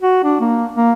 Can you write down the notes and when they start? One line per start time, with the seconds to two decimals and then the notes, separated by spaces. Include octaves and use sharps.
0.02 F#4
0.24 D4
0.40 A#3
0.75 A#3